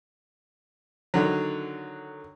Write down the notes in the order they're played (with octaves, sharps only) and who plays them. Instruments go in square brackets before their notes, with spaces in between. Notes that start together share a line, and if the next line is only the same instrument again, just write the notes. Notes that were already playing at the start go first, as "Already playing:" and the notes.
[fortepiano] D3 D#3 F#3